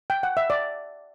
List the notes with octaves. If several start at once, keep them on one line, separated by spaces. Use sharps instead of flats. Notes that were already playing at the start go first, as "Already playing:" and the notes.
G5
F#5
E5
D5